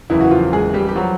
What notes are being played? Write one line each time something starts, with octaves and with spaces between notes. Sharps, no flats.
F#1 E2 C#3 E3 E4
F#4
F3 F4
G#3 G#4
G3 G4
G4
F3 F#3 F#4